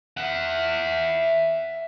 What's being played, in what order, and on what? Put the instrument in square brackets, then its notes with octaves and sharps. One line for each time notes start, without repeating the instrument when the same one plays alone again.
[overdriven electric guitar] E5 F#5